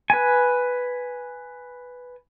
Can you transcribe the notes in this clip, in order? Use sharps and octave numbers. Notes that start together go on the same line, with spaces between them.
B4 G#5